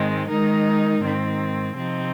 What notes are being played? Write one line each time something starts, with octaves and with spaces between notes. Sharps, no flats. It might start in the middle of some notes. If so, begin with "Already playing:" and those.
Already playing: G#2 D#3 G#3 C4
D#3 G#3 D#4 A#4
G#2 D#3 C4
C3 F3 C4 D#4